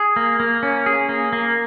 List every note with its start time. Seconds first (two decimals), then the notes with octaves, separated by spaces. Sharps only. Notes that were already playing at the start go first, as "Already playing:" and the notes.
Already playing: G#4
0.16 A#3
0.40 A#3
0.63 C#4
0.86 G#4
1.09 A#3
1.33 A#3